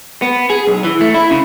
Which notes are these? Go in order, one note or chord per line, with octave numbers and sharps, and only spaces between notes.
B3
G#4
B1
E3
A3
E4
C#3